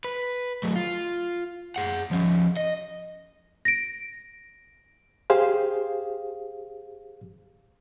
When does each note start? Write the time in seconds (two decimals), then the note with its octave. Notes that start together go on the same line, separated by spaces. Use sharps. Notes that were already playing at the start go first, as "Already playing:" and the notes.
0.04 B4
0.63 F#3 A3
0.76 F4
1.76 G#4 F#5
2.11 F3 C#4
2.57 D#5
3.65 A#6 D7
5.30 G4 G#4 C5 F5